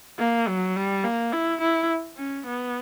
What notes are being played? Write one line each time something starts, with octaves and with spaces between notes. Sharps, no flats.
A#3
F#3
G3
A#3
E4
E4
C#4
B3